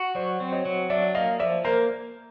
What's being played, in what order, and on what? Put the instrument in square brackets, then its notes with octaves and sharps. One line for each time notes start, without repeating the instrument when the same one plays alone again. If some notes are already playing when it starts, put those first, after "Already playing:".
Already playing: [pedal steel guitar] F#4
[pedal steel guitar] F#3 [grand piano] C5 D5
[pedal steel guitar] C4
[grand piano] C#5 D#5
[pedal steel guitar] F#3
[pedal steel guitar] D4 [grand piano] D5 E5
[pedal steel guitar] A#3 [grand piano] D#5 F5
[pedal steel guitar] F3 [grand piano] D5 E5
[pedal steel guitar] A#3 [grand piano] A#4 C5